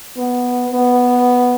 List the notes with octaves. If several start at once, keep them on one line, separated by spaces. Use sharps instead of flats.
B3
B3